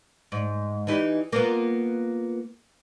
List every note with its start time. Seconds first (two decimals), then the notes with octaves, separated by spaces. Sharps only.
0.32 G#2
0.87 E3 D#4 G4
1.32 A#3 B3 F4